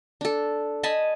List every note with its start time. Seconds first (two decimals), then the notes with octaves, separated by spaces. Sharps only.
0.21 D4 A4
0.83 D#5 G#5 A5 B5